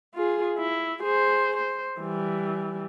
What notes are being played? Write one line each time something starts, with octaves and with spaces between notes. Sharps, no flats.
F4 G#4
E4
G#4 C5
C5
E3 G3